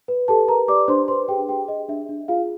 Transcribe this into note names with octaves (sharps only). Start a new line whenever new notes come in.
B4
G4 A4 A5
A#4 B4 A#5
G4 D5 D6
D4 C5 C6
B4 C5 C6
G4 G#4 G5
G4 G#4 G5
G#4 D#5
D4 E5
D4
F4 G#4 F5